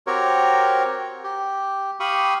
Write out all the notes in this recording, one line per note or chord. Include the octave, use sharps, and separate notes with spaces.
C4 F#4 G4 A#4 C#5
G4
G4 F5 B5 C#6 D#6